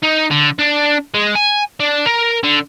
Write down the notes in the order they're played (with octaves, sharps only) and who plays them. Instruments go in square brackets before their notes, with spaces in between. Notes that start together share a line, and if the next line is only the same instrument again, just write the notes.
[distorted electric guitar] D#4
D3
D4
G#3
G#5
D4
A#4
D3